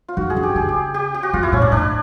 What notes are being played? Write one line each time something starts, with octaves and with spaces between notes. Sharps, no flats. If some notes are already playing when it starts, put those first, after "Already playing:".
F4
D#3 F#4
G#4
D3
G4
C#3 G#4
G4
G4
G4
F#4
C3 F4
E4
A#2 C#4
D4
A2 D4